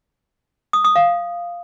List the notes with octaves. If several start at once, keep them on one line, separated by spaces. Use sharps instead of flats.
D#6
D#6
F5